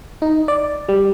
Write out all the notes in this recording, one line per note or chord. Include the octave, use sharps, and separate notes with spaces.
D#4
D5
G3